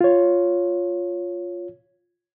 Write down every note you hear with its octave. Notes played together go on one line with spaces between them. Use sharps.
F4 C#5